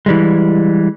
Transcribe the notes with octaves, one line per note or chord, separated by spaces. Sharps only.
E3 G3 G#3